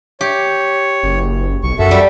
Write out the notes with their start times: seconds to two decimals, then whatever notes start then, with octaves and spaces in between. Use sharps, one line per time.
0.21 G4 C#5
1.03 F#1
1.63 B1 C#6
1.79 F#2 F#4 A4 E5
1.91 G3